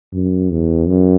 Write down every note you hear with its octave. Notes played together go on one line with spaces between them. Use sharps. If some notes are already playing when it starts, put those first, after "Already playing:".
F#2
E2
F#2